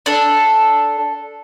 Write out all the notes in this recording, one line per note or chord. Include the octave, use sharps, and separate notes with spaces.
D4 A4